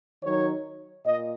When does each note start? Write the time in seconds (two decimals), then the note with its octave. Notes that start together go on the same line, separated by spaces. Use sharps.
0.22 D#3 F#3 D#4 C#5
1.05 A#2 D#5